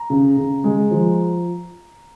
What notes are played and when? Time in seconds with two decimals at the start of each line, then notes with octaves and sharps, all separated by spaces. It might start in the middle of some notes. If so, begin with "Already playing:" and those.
Already playing: A#5
0.10 C#3
0.37 C#3
0.64 G#3
0.91 F3